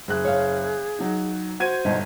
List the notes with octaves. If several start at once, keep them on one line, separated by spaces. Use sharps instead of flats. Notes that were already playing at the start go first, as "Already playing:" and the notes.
F#1 G#4 F#6
C#5 F5
F#3 D#4
F#4 C5 G#6 D#7
G1 B2 D#4